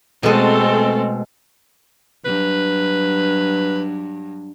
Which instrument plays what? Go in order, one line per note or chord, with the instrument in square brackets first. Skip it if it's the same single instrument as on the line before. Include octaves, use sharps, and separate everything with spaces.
[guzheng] B2 G#3 [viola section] A3 C4 A4
[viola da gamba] G2 F#3 [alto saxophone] B4